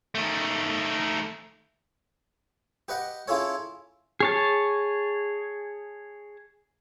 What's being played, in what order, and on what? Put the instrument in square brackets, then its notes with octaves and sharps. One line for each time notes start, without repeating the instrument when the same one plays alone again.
[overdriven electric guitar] D#3 A3
[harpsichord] G4 B4 D#5 F#5
C#4 E4 F4 G#4 A4 C#5
[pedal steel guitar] G#4 C#5 A5